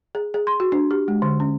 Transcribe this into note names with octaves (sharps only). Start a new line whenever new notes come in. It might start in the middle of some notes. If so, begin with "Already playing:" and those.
G#4
G#4
C6
F#4
D4
G4
G#3
D3
C#4